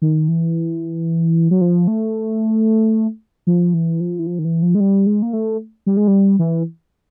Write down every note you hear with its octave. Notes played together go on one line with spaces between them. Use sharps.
D#3
E3
F#3
F3
A3
F3
E3
F3
E3
F3
D#3
E3
F3
G#3
G3
G#3
A#3
A3
G3
G#3
G3
E3